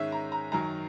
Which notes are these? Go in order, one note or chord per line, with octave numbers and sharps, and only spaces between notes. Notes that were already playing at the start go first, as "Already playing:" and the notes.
Already playing: G#2 D#3 G#3 C#4 E5
A#5
A#5
F#2 D#3 F#3 A#5